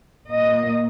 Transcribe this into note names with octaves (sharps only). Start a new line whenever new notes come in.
A#2 A#3 D#5